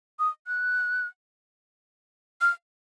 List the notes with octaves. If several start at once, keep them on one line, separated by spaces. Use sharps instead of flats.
D#6
F#6
F6